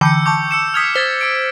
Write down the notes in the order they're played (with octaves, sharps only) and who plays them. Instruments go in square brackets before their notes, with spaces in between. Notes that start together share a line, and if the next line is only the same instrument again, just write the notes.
[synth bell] D3 E3 G5 [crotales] E6 G6 C#7
[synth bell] A5 C#6 G6 [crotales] D6
[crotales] E6 C#7 E7
[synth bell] D#6 F7 [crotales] F6 G#6 B6
[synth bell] C5 [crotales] G#6 A6 B6
[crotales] E6 D7